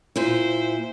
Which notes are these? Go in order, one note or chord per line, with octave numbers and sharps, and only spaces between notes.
A#2 E4 C5